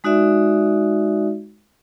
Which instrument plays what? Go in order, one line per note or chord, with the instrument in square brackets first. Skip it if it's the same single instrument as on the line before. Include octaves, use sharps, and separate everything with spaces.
[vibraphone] G#3 D#4 F#4 D5 E5